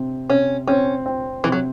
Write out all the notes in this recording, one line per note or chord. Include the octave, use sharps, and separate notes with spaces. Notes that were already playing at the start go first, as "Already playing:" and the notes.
Already playing: C3 C4
C3 C#4
C4 C#4
C4
C3 E3
F#3